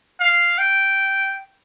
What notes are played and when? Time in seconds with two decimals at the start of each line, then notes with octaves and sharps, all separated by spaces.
0.20 F5
0.59 G5